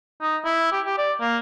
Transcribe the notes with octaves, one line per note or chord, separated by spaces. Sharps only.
D#4
E4
G4
G4
D5
A#3